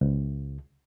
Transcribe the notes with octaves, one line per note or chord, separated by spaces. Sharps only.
C#2